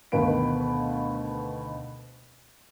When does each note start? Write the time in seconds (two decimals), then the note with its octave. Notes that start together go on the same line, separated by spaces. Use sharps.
0.12 D2 B2 D#3 B4 F5 D7